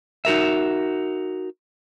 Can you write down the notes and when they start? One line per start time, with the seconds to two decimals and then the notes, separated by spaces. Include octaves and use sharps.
0.25 D#4 F#4 A#4 E5